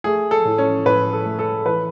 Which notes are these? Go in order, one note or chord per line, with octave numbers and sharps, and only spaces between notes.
A3 G#4
A4
A2
C#4
A2 B4
A4
A3
A4
E3 B4